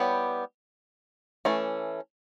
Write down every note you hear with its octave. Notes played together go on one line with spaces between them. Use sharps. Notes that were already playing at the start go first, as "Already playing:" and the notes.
Already playing: G3 B3 E4 G4 C#5
E3 A3 C#4